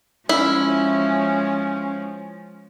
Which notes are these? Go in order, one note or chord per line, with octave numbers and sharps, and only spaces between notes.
F3 G#3 C#4 E4